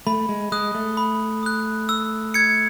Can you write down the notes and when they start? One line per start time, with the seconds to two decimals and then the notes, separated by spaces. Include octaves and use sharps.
0.07 A3 B5
0.29 G#3
0.52 G#3 D#6 F#6
0.75 A3
0.97 B5
1.43 D#6 F#6
1.89 E6
2.34 G#6 C#7